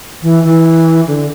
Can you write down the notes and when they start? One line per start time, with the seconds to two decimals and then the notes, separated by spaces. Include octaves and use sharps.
0.22 E3
0.44 E3
1.07 D3